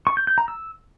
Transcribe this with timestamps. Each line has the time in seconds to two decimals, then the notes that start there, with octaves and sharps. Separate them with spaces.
0.07 C#6
0.17 G6
0.27 G6
0.38 A#5
0.48 E6